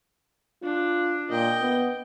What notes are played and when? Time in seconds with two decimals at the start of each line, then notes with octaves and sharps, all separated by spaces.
0.63 D4 F4
1.31 A#2 D#5 G5
1.61 B3